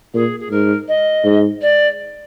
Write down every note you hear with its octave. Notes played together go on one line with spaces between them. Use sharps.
A#2 G#4
G#4
G#2 A#4
D#5
G#2
D5